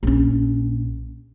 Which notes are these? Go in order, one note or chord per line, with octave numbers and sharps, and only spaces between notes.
A#1 C#4